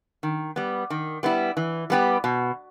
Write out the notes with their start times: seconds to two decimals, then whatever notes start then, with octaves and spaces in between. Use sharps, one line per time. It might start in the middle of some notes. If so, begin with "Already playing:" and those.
0.23 D#3
0.56 G3 B3
0.90 D#3
1.23 G3 B3 E4
1.57 E3
1.90 G3 B3 G4
2.24 B2